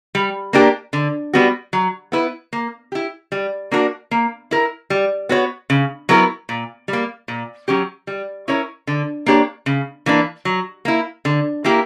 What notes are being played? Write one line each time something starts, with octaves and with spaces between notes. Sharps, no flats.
G3
A#3 D4 G4 A#4
D3
G3 B3 F#4
F#3
B3 E4 B4
A#3
E4 G4
G3
A#3 D4 F#4 A#4
A#3
E4 A#4
G3
B3 F#4 C#5
C#3
F#3 B3 E4 A#4
A#2
G3
A#3
A#2
F#3 C#4 G4
G3
C#4 E4 A#4 C#5
D3
A#3 D4 G4 C#5
C#3
E3 A#3 D4
F#3
A#3 E4
D3
A#3 E4 G4 A#4